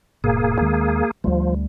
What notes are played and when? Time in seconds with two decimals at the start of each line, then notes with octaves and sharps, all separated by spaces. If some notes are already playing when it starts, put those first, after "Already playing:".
0.24 D1 G#2 B2 A#3 G#4
0.61 D#2 D#3 G#3
1.24 D2 F3 G3 A3